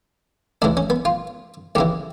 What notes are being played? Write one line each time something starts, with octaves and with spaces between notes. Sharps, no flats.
D2 C#3 E3 D4
C#4
B3
F4
D#2 C#3 E3 G4